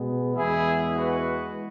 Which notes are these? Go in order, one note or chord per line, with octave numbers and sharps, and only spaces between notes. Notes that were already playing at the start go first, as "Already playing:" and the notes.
Already playing: B2 G#3 B3
E2 E3 G#3 B3 E4 G#4
F#4 B4